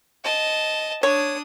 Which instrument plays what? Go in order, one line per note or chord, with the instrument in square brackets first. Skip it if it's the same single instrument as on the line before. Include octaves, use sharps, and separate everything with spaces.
[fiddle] D#5 A5
[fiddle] D4 D#6 [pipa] C#5